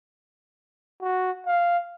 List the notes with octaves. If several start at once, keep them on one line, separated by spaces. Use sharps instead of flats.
F#4
F5